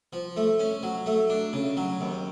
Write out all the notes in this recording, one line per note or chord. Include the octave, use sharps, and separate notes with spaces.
F3
A3
C#4
F#3
A3
D4
C#3
F#3
D#2